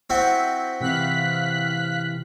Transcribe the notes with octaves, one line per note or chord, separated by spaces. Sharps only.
C4 E4 F#4
C3 E3 F5 F#6 B6